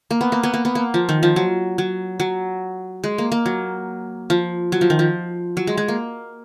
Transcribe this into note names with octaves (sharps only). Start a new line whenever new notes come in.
A#3
B3
A#3
B3
A#3
B3
A#3
F3
D#3
F3
F#3
F#3
F#3
G#3
A#3
A#3
F#3
F3
F#3
F3
D#3
F3
F#3
G#3
G#3
A#3